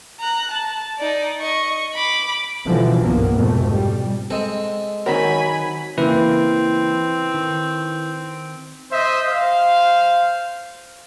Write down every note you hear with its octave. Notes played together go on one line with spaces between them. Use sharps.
A#5 F#6
A5
D#4 D5
D#5 C#6
B5 D6
B2 D3 E3 F3 G3
F#1 C2 G2 A#2 A#3 B3
F1 F2 G#2 B2 A3
G3
G#3 C4 A4
D#3 F#3 C4 A#4 G#5 B5
C#3 E3 A#3 C4 E4 B4
D#3
C5 D#5 E5
C5 F5